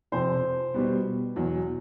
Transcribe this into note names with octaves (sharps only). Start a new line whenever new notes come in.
F2 C3 F3 C5
B2 G3 B3
E2 B2 F#3